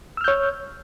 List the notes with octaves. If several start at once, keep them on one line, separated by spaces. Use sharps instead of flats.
C#5 E6 F6 G6